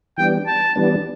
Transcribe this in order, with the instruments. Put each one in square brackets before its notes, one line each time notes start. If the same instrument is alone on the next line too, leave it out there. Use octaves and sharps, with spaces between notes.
[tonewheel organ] E3 G3 B3 D4 [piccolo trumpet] G5
[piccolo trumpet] A5
[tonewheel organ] E3 G3 B3 D4